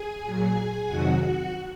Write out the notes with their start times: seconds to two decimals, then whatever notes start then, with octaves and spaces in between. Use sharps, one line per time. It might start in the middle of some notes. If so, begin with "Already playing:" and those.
Already playing: G#4 G#5
0.23 A#2 F#3
0.87 F2 C3 D#3 F#3 F#4 F#5
1.18 F#4 F#5